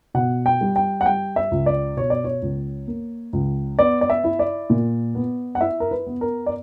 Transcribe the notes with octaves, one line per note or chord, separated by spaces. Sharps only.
B2 F#5
G5
G3
G5
F#5
G3 G5
E5
C#2
D5
B2 C#5
D5
C#5
C#2
A#3
C#2
B3 D5
D5
E5
E4
D5
A#2
B3
F#5
E4 E5
A#4
B4
B3
A#4
D5